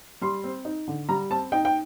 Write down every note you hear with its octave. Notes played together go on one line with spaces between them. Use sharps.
G3 C6
C4
D#4
D3
G3 A#5
C4 A5
D#4 G5
G5